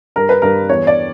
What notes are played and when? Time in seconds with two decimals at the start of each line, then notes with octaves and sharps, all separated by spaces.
0.16 G2 A#4
0.29 B4
0.42 G2 A#4
0.69 E2 C#5
0.87 D5